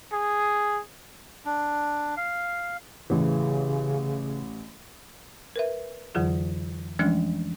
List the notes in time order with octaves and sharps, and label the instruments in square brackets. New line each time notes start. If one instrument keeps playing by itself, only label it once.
[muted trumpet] G#4
[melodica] D4
F5
[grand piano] A1 E3 [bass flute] C#3
[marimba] A#4 B4 E5
F2 D3 E3 F#3 F4 G#4
E3 F3 G#3 A3 C#4 D4